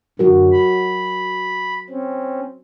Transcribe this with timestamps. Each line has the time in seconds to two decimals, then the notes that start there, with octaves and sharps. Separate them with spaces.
0.19 F#2 D3 F#3 F#4 A#4
0.52 B5
1.90 C4 C#4